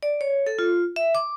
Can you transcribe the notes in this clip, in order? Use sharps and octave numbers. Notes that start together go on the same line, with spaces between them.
D5
C#5
A4
F4
E5
D6